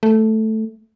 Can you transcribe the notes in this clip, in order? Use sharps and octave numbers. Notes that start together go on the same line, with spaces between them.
A3